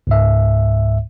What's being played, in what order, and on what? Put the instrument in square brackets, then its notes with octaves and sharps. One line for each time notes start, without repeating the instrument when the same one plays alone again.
[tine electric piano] C#2 G#2 E5